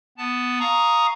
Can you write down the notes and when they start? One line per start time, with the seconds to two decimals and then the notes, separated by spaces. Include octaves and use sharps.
0.18 B3 A5
0.60 F5 A#5 C#6 D#6